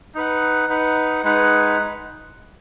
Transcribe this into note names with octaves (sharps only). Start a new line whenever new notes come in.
D#4 B4 F#5
D#4 B4 F#5
G#3 D#4 B4 F#5